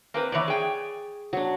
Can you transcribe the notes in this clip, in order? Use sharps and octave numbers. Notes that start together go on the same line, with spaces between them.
A#3 C4 B4
E3 B3 C#5 D5
G#4 G5
F#3 D4